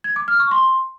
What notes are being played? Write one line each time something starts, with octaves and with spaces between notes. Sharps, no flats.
G#6
D6
F6
C#6
C6